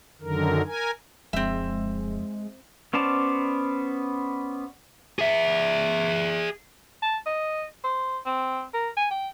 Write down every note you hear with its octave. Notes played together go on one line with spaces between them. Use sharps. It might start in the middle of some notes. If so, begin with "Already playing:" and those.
F#2 D3 D#3 A#4
A#4 G#5
D1 F2 G#3 C4 E5
B3 C#4 C5 D5 A5
G#4 E5
A5
D#5
C5
C4
A#4
G#5
G5